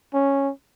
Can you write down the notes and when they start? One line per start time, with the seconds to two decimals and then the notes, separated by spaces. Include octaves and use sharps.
0.14 C#4